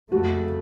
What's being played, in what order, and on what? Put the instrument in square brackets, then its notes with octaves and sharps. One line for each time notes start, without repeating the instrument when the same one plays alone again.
[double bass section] F2 C#3 F3 A3 [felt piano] F#4